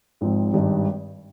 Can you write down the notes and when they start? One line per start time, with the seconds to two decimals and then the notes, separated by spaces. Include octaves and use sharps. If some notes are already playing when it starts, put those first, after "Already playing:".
0.21 G#1 G#2 F3 C4
0.53 G#1 G2 D#3 G3